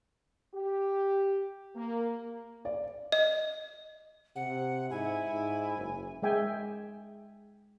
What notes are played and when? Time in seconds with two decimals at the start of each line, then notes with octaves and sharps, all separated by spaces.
0.53 G4
1.76 A#3
2.65 D5
3.12 D#5
4.36 C3 F#5
4.91 G#2 E4 G#5
5.31 G#2
5.76 F#1
6.22 G#3 G#4 E5 G5 G#5